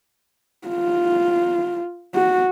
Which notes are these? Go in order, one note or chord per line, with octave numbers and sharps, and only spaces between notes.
F4
F#4